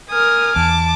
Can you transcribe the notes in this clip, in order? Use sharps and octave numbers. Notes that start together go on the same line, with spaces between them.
A#4 G#5 D#6 F6
E2 A5 D6